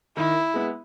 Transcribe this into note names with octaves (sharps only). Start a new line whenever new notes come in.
D#3 E4
G#3 B3